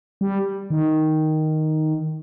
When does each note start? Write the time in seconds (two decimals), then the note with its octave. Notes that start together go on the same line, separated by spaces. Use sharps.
0.21 G3
0.70 D#3